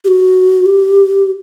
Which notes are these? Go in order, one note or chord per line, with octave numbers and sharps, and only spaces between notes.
G4
F#4
G4